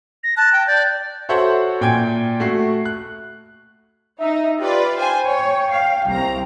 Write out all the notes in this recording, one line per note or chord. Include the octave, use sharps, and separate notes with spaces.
A#6
A5 F#6
G5
D5 G6
F#4 A4 C5 C#5 E5 F#5
A#2 G5 G#5 G#6 D7
A3 F#4 C7
F#6
D#4 E5
F4 G4 B4 D5
C5 G5 G#5
C#5
F5
C2 C4 A#5